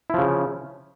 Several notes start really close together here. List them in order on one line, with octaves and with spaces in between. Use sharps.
E4 F3 C#3